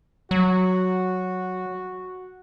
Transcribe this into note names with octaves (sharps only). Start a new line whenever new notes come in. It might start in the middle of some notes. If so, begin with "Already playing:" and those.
F#3 F#4